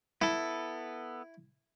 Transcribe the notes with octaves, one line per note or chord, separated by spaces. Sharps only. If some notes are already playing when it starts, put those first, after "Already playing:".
B3 E4 A4